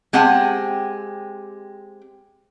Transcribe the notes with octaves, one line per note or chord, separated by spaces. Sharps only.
G#3 C4 G4 F#5 G#5